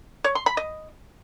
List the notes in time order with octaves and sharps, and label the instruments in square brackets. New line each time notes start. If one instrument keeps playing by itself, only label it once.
[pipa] C#5
C6
B5
D#5